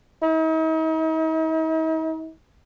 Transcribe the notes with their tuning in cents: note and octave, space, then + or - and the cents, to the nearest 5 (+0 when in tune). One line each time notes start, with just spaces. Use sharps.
D#4 +45